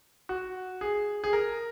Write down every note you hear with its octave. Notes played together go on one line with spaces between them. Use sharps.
F#4
G#4
G#4
A#4